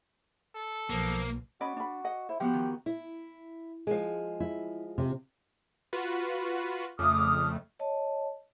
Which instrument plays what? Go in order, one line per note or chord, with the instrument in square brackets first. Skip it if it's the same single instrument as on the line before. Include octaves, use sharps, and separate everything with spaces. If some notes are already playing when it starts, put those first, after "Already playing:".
[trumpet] A4
[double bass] B1 [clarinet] F3 [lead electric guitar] A#3
[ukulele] C#4 D#5 B5 [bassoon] F#4 [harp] D5
[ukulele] D4 B5
D#5 F#5
[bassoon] E4 [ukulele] C5
[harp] F3 B3 F#4 [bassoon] G4
[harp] D#3
[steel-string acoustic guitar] E4
F3 G#3
[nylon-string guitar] E4
C3
[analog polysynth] F4 F#4 B4
[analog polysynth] F2 C#3 A3 [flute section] D6 D#6 F6
[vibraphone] C#5 D#5 A5